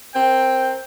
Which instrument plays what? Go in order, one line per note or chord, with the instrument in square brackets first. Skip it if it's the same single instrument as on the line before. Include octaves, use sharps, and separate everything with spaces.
[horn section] C4 A#4 C5 G5